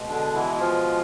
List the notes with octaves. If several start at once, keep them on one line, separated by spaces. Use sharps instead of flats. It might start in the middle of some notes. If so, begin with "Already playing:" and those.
Already playing: B2 G#3
D3 D4
E3 E4
E4
F3 F4